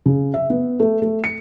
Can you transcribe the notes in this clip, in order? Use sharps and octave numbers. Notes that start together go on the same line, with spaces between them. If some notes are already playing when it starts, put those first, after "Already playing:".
C#3
E5
B3
A3
A3
C#7